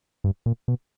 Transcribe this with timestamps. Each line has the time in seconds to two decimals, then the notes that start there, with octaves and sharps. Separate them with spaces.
0.24 G2
0.46 A#2
0.68 B2